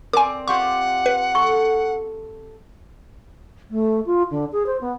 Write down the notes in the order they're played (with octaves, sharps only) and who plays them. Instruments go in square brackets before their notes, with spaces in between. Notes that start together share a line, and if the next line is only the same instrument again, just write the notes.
[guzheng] C4 D5 [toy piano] A#4 [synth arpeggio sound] G#5 D6
[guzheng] F4 G4 C5 [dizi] F#5 [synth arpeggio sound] C#6
[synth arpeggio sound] B4
[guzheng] A4 [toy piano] C#6
[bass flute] A3
F4
D3
G#4
C5
B3